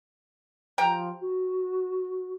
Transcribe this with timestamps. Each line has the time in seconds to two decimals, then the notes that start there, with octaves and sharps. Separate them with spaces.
0.78 F3 G4 G5 A#5
1.20 F#4